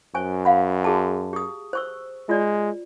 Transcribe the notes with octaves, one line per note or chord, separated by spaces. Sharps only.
F#2 C5 G#5 C#6
F5 F#5 B5
F#4 G#4 A5
G4 D#6
C5 C#6 E6
G#3 F4 D5